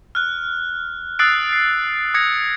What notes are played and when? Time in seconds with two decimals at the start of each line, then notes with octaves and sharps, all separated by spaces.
0.15 F6 F#6
1.19 D#6 E6 F#6 A6 C7 D7
1.53 C7
2.14 D#6 G#6 A#6 C#7